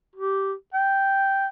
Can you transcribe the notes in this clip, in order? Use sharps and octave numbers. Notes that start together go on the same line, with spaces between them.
G4
G5